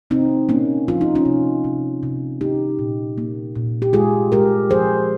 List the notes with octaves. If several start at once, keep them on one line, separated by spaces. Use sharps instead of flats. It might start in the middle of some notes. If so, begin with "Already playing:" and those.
C3 C4 D#4
A#3 C#4
F3 F4
D#4
C#4 F4
C3
C3
C3
A#3 D#4 G4
A#2
A#3
A#2
G4
G#3 F4 G#4
G#3 G4 A#4
F3 G#4 C5